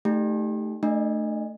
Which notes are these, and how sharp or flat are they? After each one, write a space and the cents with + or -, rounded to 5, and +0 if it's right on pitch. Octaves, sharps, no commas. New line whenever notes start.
A3 -5 D#4 +0 G4 +0
A3 +0 D4 +35 D#5 +0